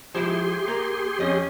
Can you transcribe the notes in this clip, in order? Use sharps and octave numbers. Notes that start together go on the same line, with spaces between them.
F3 G#3 E4 G4 G#4 C6
A#3
F2 C#4 D#5